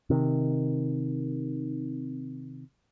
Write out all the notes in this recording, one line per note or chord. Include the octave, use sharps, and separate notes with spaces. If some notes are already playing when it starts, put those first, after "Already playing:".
C3 D#3